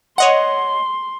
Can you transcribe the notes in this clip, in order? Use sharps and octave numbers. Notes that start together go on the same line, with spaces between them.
C#5 D#5 F#5 C6